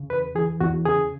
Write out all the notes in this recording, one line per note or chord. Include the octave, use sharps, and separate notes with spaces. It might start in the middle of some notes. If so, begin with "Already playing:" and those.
Already playing: C#3
E2 B4
E3 G#4
E2 F#4
C#3 G#4